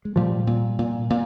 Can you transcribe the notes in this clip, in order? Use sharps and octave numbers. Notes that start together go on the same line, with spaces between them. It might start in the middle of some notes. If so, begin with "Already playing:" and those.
G#3
A#2 F3 G3
A#2
A#2
A#2